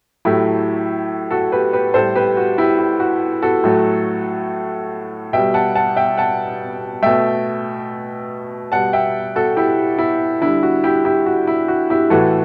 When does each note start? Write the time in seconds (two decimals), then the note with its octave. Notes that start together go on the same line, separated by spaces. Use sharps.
0.25 A2 F#3 A3 E4 G4
1.31 F#4 A4
1.52 G4 B4
1.73 G4 B4
1.94 A2 G3 A4 C5
2.15 G4 B4
2.37 F#4
2.58 E4 G4
2.79 E4
3.00 F#4
3.42 F#4 A4
3.64 A2 F#3 A3
5.33 B2 G3 E5 G5
5.54 F#5 A5
5.75 F#5 A5
5.96 E5 G5
6.17 F#5 A5
7.02 B2 A3 E5 G5
8.72 B2 G3 F#5 A5
8.93 E5 G5
9.36 F#4 A4
9.56 E4 G4
9.98 E4
10.41 D3 G3 E4
10.63 F#4
10.84 E4 G4
11.05 E4 G4
11.26 F#4
11.47 E4
11.68 F#4
11.90 E4 G4
12.10 A2 E3 A3 F#4 A4